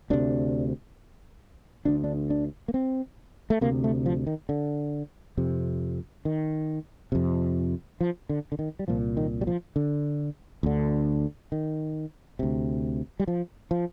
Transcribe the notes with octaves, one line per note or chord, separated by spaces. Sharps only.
D2 C3 D4
D2 D3 D4
D4
D4
A#3
C4
A3
D2 C3 A#3
A3
F3
D#3
D3
F2 C3
D#3
F2 C3
F3
D3
D3
D#3
G3
C2 A#2 F3
D#3
G3
F3
D3
D2 D3
D#3
D2 C3
G3
F3
F3